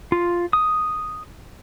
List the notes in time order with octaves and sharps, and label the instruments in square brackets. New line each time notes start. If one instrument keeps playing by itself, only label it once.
[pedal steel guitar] F4
D#6